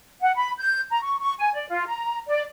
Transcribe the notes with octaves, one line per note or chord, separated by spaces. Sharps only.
F#5
B5
G6
A#5
C#6
C#6
G#5
D5
F4
A#5
D5